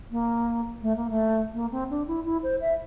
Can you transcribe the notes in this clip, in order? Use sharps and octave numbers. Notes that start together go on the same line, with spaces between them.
A#3
A3
A#3
A3
A#3
C4
D4
E4
E4
C5
E5